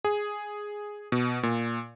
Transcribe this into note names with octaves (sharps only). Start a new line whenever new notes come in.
G#4
B2
A#2